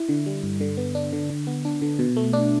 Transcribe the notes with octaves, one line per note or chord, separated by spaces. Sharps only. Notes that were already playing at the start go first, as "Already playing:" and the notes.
Already playing: E4
D3
G3
G2
D3
B3
D4
D3
D3
B3
D4
D3
B2
A3
D4